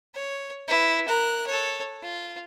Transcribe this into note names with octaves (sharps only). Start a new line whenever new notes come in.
C#5
E4 B4
A#4 F#6
A4 C#5
F4